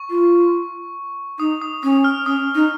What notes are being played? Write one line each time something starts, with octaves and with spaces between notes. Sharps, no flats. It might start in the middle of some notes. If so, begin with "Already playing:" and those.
Already playing: C#6
F4
D#4 D#6
D#6
C#4 D#6
F6
C#4 D#6
D#4